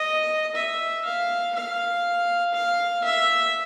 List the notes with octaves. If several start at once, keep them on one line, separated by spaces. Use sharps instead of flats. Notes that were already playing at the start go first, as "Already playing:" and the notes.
Already playing: D#5
E5
F5
F5
F5
E5